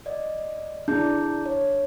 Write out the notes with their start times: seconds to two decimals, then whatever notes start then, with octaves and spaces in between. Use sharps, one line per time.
0.06 D5 D#5
0.88 D4 E4 G#4 G6
1.46 C#5